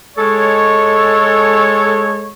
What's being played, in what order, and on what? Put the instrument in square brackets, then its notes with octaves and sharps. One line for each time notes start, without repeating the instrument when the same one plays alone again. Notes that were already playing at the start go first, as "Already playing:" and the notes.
[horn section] G#3 A4 C#5